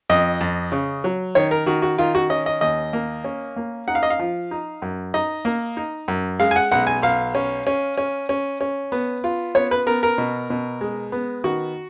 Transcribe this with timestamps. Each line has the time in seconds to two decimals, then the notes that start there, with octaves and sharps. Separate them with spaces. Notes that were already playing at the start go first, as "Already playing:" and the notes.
0.10 F2 D#5
0.41 F2
0.72 C#3
1.04 F#3
1.35 D#3 C#5
1.51 A#4
1.66 D#3 F#4
1.82 F#4
1.98 D#3 F4
2.15 F#4
2.30 C#4 D#5
2.46 D#5
2.61 D#2 D#5
2.93 A#3
3.24 C#4
3.56 A#3
3.88 D#4 F#5
3.95 F5
4.03 D#5
4.10 F5
4.19 F3
4.51 D#4
4.82 F#2
5.14 D#4 D#5
5.45 A#3
5.77 D#4
6.08 F#2
6.40 G#3 F5
6.51 G#5
6.56 F#5
6.71 B1 F#5
6.87 G#5
7.02 B1 F5
7.35 C#4
7.67 C#4
7.98 C#4
8.29 C#4
8.61 C#4
8.92 B3
9.24 F4
9.55 B3 C#5
9.71 B4
9.87 B3 A#4
10.03 A#4
10.18 B2
10.50 B2
10.81 G#3
11.12 B3
11.44 D#3 F#4